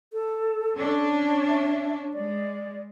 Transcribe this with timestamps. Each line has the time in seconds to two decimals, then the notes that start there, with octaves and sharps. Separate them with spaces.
0.13 A4
0.77 C#4 D4
1.48 E5
2.14 G#3 D5